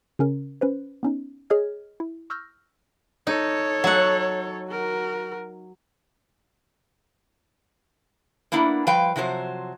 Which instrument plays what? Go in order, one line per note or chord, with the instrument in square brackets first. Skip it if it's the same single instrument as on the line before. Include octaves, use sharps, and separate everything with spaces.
[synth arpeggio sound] C#3 C#4 A#4
C#4 B4 C5
B3 C#4 D#4
G#4 C#5 D#5 F6 G#6
E4
C#6 E6 F6 G6 A#6
[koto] D#4 [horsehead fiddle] A4 C#5
[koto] F#3 F#5
[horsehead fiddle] F#4 A#4
[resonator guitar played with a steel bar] A#3 B3 D4 E4
F3 G3 B4 F5 G5
C3 F3 F#3 C5